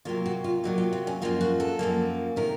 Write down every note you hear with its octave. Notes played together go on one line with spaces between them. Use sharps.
C3 F#3 A#3 F4
F#4
F4
C3 F#3 A#3 D#4
F4
C4
C#4
F#2 F3 A#3 F4
F#4
A4
F#2 F3 A#3
C3 D#3 A3 A#4